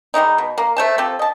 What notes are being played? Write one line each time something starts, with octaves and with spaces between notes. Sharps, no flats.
G3 G#3 A#3 D#4
B2
A#3
A3 C5 A5
C4 F4 G4 A4
D#5 A5